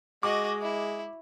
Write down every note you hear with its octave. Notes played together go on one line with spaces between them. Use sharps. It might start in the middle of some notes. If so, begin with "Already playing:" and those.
G#3 F#4 D#5 D6
E4